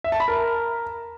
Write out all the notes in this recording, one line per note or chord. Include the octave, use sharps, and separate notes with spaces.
E5
A5
B5
A#4